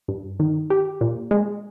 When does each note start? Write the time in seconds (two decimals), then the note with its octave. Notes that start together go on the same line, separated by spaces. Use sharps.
0.08 G2
0.40 D#3
0.70 G4
1.01 A#2
1.31 G#3